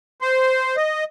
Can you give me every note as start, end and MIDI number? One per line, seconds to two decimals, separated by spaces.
0.22 0.76 72
0.77 1.04 75